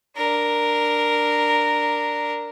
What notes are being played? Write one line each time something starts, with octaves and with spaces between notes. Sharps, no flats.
D4 A#4